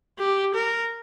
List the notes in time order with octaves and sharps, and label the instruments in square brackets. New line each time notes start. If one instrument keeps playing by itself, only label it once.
[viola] G4
A#4